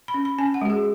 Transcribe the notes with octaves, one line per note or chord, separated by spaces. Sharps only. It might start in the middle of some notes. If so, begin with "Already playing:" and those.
B5
C#4
B5
C#4 G#5
F#5
G#3 F#4
G#4